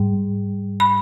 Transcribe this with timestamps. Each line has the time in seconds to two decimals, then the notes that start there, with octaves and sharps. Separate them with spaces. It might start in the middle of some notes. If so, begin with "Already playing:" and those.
Already playing: G#2 G3
0.80 B5